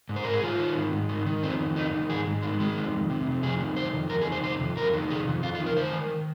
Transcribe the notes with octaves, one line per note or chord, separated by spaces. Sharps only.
G#2
C5
G#2 A#4
G#4
D#3 F4
D#3
G#2
G#2
D#3
D#3
F2 C4
F2
D#3 D#4
D#3
G#2 G#4
G#2
D#3 G#3
D#3 G#3
F2
F2
C3
F2
F2 G#4
D#3
C3 C5
F2
F2 A#4
G#4
D#3
C5
C3 C5
F2
F2 A#4
D#3
C3 G#4
F2
F2 F4
F4
D#3
A#4
D#3 C5
D#3